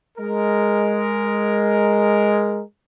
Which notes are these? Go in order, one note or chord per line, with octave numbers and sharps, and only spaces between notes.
G#3 A#4